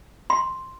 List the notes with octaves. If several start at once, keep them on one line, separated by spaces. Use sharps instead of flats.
C6